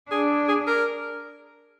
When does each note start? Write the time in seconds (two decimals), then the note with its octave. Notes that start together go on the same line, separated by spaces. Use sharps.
0.11 D4 G#4
0.48 G#4
0.67 A#4